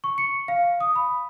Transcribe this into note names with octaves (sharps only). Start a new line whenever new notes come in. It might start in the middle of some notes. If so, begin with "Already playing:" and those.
C#6
C#7
F5
D#6
B5